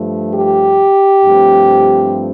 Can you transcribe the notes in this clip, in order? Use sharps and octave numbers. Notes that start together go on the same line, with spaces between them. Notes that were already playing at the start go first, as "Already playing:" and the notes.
Already playing: G2 F3 A3
G4
G2 F3 A3 C4